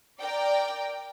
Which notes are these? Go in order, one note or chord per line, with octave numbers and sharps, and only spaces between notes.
A#4 D5 G5